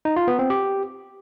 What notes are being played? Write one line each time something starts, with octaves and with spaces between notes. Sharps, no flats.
D#4
F4
B3
C4
G4